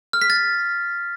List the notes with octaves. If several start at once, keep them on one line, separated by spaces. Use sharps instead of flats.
F6
B6
A6